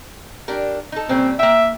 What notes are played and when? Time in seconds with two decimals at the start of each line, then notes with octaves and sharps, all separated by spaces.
0.48 D4 G4 A#4
0.92 D#4 A4
1.09 A#2 G3 C4 C#4
1.39 A#3 E5 G5